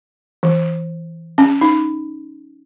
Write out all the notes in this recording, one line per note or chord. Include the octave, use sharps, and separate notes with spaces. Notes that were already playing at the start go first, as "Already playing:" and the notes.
E3
C#4
D#4